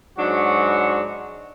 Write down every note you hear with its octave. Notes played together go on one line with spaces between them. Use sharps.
G#2 F#3 D4 F#4